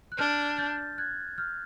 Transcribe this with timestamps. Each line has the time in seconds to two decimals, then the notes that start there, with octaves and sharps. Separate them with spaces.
0.12 F#6
0.19 D4 F6 G6
0.58 G6 A6
0.98 F#6 G#6
1.38 F6 G6